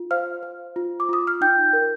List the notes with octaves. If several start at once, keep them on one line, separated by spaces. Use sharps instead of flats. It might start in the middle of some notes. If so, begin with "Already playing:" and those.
Already playing: F4
C5 F5 F6
C5
F4
D6
F4 D#6
F6
D#4 G5 G6
A#4